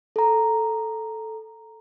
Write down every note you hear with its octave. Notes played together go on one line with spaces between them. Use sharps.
A4 A#5